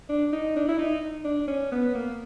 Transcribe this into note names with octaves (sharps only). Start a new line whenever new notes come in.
D4
D#4
D4
E4
D#4
D4
C#4
B3
A#3